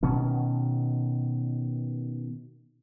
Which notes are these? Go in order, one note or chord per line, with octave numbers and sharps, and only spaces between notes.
B2 D#3 C#4